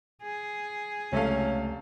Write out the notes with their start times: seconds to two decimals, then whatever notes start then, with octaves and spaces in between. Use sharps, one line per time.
0.22 G#4
1.13 F1 C#2 A3 C#4 A4 F5